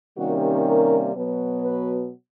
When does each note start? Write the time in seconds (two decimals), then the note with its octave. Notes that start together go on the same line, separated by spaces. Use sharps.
0.16 C3 D#3 G3 A#3 C#4 F#4
0.65 A#4
1.13 B2 F#3 B3
1.62 B4